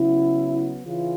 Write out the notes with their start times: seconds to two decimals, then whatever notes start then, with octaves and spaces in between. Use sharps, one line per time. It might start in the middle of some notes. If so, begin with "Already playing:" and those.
Already playing: C#3 F#3 B3 E4
0.84 C#3 E3 F4